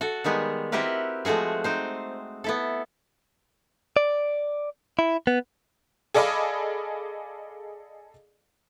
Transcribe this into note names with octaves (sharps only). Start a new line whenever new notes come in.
F#4 A4
D#3 G3 G#3 B3
C4 E4 F#4 G4 A#4 B4
F3 G#3 A3 F#4 G#4
C4 D#4 C5
B3 E4 A4
D5
E4
B3
G#4 A4 D5 D#5 F5 B5